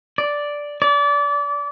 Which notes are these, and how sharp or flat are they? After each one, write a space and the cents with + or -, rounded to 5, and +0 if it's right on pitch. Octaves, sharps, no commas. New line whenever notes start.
D5 -5
D5 -30